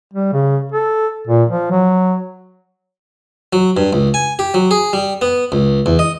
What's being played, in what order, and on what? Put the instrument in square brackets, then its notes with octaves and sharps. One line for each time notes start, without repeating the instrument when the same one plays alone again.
[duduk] G3
C#3
A4
A#2
F3
F#3
[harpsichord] F#3
G2
C#2
G#5
G4
F#3
G#4
G3
B3
C#2
E2
D#5